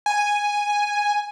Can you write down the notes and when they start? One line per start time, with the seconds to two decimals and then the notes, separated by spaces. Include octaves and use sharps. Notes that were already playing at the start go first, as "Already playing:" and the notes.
0.06 G#5